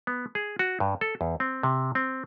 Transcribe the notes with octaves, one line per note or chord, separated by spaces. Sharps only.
B3
G#4
F#4
G2
A4
E2
C4
C3
C4